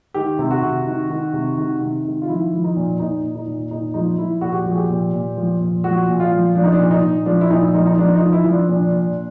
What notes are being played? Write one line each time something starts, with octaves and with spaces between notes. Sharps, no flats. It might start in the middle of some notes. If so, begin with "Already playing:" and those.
D#3 G4
C3
F#4
C3
D#3
D#3
C3
D#3
C3
D#3
F4
F3 E4
F3
D#4
A#2
A#2 D#4
A#2
D#4
A#2
A#2 D#4
F3 D#4
F3 E4
A#2 F#4
G4
F3 F#4
G#4
G4
A#2
A#2
F3
A#2
F3 F#4
A#2
F4
F3
F3 D4
D#4
D4
A#2
D#4
A#2
F3 D4
E4
A#2 D#4
F3 D#4
D#4
F3 D4
D#4
F3
E4
F3
D4
A#2 D4
A#2